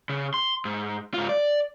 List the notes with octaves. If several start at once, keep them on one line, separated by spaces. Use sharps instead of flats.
C#3
C6
G#2
G#2 F4
D5